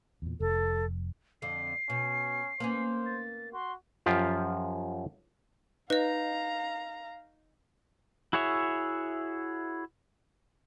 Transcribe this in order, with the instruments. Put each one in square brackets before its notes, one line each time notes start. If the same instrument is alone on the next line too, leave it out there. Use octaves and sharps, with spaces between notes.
[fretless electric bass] E2 A#2
[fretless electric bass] F1 [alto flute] A4
[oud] F2 D3 [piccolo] C7
[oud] B2 [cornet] C#4
[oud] A#3 B3 C#4 [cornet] C5
[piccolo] A6
[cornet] F#4 [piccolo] C6
[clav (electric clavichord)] F#2 F3 F4 G4
[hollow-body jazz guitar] D#4 [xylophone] B4 D#5 [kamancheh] F5 A#5
[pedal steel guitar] E4 F#4 G#4 C#5 E5